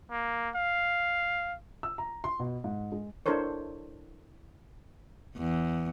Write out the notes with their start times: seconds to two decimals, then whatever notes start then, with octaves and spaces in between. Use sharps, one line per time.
0.11 A#3
0.55 F5
1.83 E6
1.98 A#5
2.24 C6
2.40 B2
2.64 G#2
2.92 G#3
3.26 D4 E4 A4 A#4 C5 C#5
5.37 E2